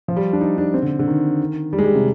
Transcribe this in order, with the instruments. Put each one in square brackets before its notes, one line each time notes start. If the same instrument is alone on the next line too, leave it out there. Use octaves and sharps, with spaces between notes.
[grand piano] F3
G3
D4
D#4
D4
C4
D3
D3
D#3
G3
G#3
G3
C3